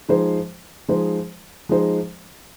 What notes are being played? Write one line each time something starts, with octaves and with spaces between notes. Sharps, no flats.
F3 G#3 D#4 G#4 C5
F3 G#3 D#4 G#4 C5
F3 G#3 D#4 G#4 C5